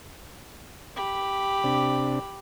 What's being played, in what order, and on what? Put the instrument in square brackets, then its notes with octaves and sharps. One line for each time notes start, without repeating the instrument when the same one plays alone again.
[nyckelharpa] G4 B5
[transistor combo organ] C3 D4